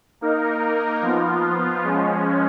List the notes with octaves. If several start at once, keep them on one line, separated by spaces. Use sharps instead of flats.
A#3 D#4 A#4
F3 B3 F4
F3 G#3 C#4